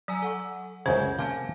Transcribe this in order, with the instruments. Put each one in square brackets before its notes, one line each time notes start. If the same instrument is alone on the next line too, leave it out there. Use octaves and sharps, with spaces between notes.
[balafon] F#3 [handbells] G#5 A#5 E6
[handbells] A4 F#5 C#6
[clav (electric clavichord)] C#2 F#2 C#3 [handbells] G#4 G6 [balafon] C5
[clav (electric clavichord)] C3 A#3 E5 [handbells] F5 G#5 A5